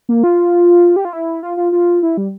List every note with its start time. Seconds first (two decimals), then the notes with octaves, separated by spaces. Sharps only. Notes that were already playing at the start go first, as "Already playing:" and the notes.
0.09 A#3
0.24 F4
0.96 G4
1.05 F4
1.13 E4
1.43 F4
1.57 F4
1.72 F4
2.03 E4
2.17 G3